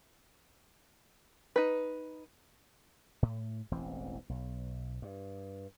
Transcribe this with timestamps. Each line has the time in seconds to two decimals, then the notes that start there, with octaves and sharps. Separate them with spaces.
1.56 D#4 B4
3.22 A2
3.71 E1 A1 E3 C4
4.29 B1
5.02 G2